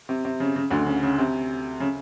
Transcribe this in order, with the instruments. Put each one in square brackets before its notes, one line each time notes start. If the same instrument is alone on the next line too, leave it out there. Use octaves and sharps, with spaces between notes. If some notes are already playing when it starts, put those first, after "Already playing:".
[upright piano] C3
C3
C#3
C#3
D2 D3
C#3
C#3
C3
C#3